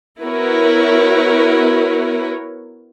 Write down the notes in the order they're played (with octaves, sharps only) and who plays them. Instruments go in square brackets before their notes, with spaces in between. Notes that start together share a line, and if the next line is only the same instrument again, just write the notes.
[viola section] B3 E4 F#4 A#4 B4 C#5